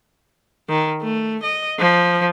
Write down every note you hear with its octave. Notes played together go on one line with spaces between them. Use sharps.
D#3
A3
D#5
F3